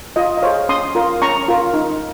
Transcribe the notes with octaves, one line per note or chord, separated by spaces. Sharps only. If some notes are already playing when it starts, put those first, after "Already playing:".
F4 D#5
D#5
G#4 C5 C#5 F5
C#4 C6 D#6
F4 A#4
C#4 A#5 C#6
F4 A#4
D#4